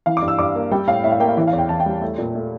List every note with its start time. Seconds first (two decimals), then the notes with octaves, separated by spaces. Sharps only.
0.06 E3 F5
0.17 D6
0.22 G2
0.28 E6
0.39 G2 D6
0.55 A#3
0.71 G3 G5
0.87 A2 F5
1.04 A2 E5
1.12 F5
1.20 A#3 G5
1.29 F5
1.37 E3
1.47 F5
1.53 E2
1.58 G5
1.69 E2 A5
1.80 G5
1.86 G3
2.01 A3
2.18 A#2
2.35 A3